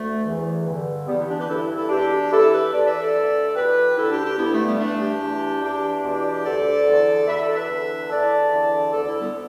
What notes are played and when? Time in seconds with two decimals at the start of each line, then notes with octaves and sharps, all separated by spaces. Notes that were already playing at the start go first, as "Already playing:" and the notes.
Already playing: D2 A3
0.25 E2 E3
0.66 G2 D3
1.07 E2 E3 G3 B3
1.17 B3 E4
1.28 D4 G4
1.38 G4 B4
1.48 G2 E3 E4 A4
1.76 E4 A4
1.89 E2 B2 D4 G4
2.31 E2 E3 E4 A4
2.51 G4 B4
2.72 E2 E3 A4 D5
2.87 B4 E5
3.00 A4 D5
3.13 D2 D3
3.48 D5
3.55 E2 B2 G4 B4
3.96 D2 D3 E4 A4
4.10 D4 G4
4.24 D4 G4
4.37 G2 D3 B3 E4
4.52 A3
4.66 G3 B3
4.79 G2 E3 A3 D4
5.00 D4 G4
5.20 E2 E3
5.62 E2 E3 D4 G4
6.03 E2 B2
6.44 D2 D3 A4 D5
6.86 E2 D3
7.27 E2 B2 B4 E5
7.40 A4 D5
7.55 B4 E5
7.69 E2 D3
8.10 E2 E3 A4 D5
8.52 E2 D3
8.92 D2 D3 A4 D5
9.06 E4 A4
9.20 G3 B3